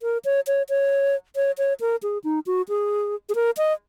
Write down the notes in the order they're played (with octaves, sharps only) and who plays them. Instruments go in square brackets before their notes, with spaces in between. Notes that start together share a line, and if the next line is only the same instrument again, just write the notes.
[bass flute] A#4
C#5
C#5
C#5
C#5
C#5
A#4
G#4
D#4
F#4
G#4
G#4
A#4
D#5